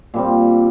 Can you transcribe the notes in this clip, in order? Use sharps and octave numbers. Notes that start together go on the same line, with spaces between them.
A#2 G3 C4